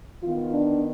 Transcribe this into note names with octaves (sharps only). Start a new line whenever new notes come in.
D#3 B3 F4
D4